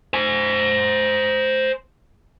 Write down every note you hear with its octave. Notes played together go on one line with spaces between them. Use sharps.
C5 G#5